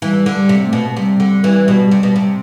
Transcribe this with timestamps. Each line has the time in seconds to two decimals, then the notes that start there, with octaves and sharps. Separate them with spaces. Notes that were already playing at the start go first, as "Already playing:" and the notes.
0.02 E3 G3
0.26 D3
0.33 G3
0.49 C3
0.65 A3
0.73 B2
0.97 C3 G3
1.20 D3
1.44 E3
1.68 B2
1.91 C3
2.03 B2
2.16 C3